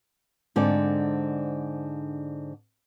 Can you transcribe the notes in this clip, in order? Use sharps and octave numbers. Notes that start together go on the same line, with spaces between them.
G#2 D3 C4 D4 D5